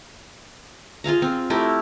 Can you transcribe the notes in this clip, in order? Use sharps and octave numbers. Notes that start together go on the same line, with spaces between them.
F4 G#4 F5 A#5
C4
A3 E4 G4 A#4